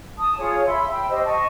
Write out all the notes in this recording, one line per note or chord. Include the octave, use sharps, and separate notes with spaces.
A5 D#6
F4 G#4 C#5
E5 B5 C6 E6
G5 E6
G4 C5 D#5
D#5 A5 C#6